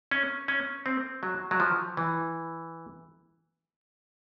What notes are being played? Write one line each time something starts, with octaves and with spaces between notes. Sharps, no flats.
C#4
C#4
C4
F#3
F#3
F3
E3